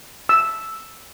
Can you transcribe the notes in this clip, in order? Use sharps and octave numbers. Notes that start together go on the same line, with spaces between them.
E6